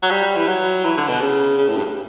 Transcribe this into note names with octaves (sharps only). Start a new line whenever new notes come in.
F#3
G3
E3
F#3
E3
D3
B2
C#3
C#3
A2
G2